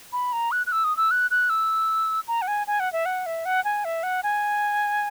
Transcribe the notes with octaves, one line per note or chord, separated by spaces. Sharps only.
B5
A#5
F#6
F#6
E6
D#6
E6
F#6
F#6
E6
A#5
F#5
G#5
G#5
F#5
E5
F#5
E5
F#5
G#5
E5
F#5
G#5